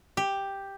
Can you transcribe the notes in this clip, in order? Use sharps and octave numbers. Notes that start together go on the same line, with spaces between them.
G4